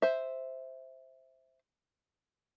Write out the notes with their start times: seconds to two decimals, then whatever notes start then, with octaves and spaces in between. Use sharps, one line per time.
0.02 C5 E5